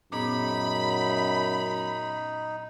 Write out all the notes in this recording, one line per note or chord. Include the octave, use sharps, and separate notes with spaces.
F#2 A#2 B3 D#4 G#4 B5